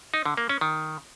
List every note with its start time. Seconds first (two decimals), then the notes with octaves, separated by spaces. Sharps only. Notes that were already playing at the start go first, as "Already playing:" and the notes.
0.14 D#4
0.26 D3
0.37 A#3
0.49 C#4
0.61 D#3